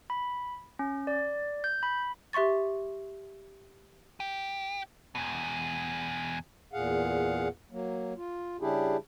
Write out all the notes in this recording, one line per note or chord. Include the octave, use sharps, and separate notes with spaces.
B5
C#4
D5
G6
B5
G4 E5 C6 C#6 A6
G4
E2 B2
E2 A#2 G#4 F5 F#5
F#3 A#3
F4
C#3 G3 D4 E4 G4 G#4